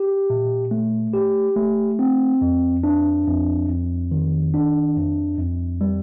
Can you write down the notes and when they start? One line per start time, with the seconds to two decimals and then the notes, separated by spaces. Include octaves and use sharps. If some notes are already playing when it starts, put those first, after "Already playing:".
Already playing: G4
0.30 A#2
0.71 A3
1.14 G4
1.56 A3
1.99 C4
2.41 F2
2.84 D4
3.27 F2
3.69 F2
4.11 D#3
4.54 D4
4.97 F2
5.38 F2
5.81 G3